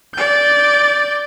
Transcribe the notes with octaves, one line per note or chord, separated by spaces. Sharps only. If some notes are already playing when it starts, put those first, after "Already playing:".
D5 G6